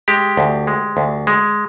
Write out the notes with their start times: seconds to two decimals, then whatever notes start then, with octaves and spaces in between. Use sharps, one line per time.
0.08 G#3 G4
0.37 D2
0.67 G#3
0.97 D2
1.27 G#3